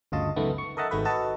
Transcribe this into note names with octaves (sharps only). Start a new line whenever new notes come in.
G1 D2 C#3 F4 D#5 A5
C#2 F#2 B2 D#3 A3 B3
C#6
A4 A#4 D#5 E5 F#5 A5
G#1 G#2 A3 F#4 B4
F#4 A4 B4 D#5 A5